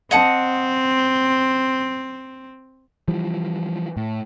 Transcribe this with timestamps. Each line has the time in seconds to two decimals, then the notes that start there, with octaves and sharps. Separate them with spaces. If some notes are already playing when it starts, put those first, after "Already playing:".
0.11 C4 D#5 F#5 A5
3.08 E3 F3 G3
3.97 A2